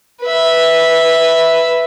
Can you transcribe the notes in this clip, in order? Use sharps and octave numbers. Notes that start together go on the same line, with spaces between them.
B4 E5